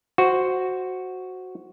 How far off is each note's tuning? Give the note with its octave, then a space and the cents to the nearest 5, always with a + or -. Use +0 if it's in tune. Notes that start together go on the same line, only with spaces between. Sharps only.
F#4 +0 C5 +0